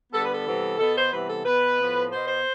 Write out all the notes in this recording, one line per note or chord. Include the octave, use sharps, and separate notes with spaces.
D3 G3 B3 A4
B4
A4
C3 E3 G3 B3
B2 B3 A4
C5
C3 E3 G3 B3 B4
A4
B2 B3 B4
A2 F3 B3
B2 B3 C5
C5